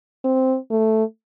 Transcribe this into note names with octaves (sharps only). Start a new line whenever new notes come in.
C4
A3